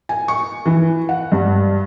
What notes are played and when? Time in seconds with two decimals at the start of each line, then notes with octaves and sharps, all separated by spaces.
0.09 G#5
0.28 C#6
0.66 E3
1.09 F#5
1.32 G2